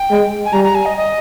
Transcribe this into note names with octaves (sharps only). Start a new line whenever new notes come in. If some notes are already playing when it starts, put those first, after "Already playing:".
Already playing: G5
G#3
G#5
G3 A#5
A#5
G#5
D#5
D#5